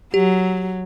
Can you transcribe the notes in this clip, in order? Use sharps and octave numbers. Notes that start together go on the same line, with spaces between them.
F#3 G4